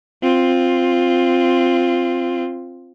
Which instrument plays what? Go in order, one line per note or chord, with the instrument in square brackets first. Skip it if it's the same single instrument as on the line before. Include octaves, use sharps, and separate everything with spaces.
[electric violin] C4 F4